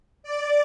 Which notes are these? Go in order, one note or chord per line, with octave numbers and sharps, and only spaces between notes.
D5